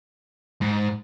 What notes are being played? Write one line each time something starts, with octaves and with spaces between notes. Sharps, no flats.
G#2